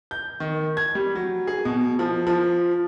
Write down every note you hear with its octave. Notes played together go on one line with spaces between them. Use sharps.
G6
D#3
G#6
G3
F#3
G#4
B2
F3
F3